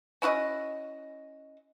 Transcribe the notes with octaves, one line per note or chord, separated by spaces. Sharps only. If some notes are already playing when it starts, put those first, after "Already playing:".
C#4 E4 F#4 D#5